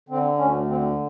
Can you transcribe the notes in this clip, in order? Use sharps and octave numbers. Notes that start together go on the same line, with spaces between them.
D3 C4
D2 C#4
D3 C4